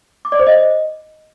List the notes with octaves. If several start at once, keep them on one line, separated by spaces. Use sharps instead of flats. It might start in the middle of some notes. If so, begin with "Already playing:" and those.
D6
D5
C5
D#5